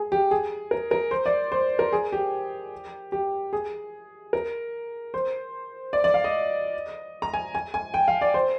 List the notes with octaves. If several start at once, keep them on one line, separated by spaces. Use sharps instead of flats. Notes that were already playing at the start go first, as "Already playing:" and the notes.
Already playing: G#4
G4
G#4
A#4
A#4
C5
D5
C5
A#4
G#4
G4
G4
G#4
A#4
C5
D5
D5
F5
D#5
A#5
G#5
G#5
G#5
G5
F5
D5
C5